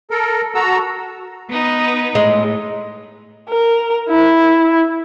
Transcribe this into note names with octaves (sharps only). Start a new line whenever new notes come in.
A4 A#4
F#4 A4 A#5 E6
B3 D#4 B4
A2 G#3
A#4
E4